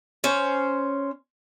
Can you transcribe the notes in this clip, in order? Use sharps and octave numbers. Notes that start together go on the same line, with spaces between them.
C#4 C5